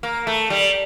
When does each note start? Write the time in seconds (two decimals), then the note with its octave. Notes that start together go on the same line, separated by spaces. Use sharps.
0.03 A#3
0.27 A3
0.50 G3